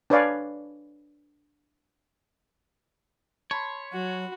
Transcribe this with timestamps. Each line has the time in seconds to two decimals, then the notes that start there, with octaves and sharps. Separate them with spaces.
0.10 D4 B4 C#5 D5 F5 G#5
3.51 C#5 A5 B5 C6
3.93 F#3 F#4